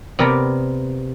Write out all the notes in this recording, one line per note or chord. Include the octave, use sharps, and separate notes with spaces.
C3 B3 A#4 D5 B5